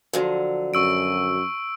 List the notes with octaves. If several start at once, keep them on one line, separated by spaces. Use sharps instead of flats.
D3 F3 F#3
F#2 C#6 E6 D7